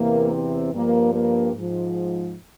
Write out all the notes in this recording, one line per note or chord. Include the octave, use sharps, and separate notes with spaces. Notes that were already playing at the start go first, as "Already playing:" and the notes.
Already playing: E2 C3 E3 A#3
C4
G2 F3 A#3
A#3
G#2 F3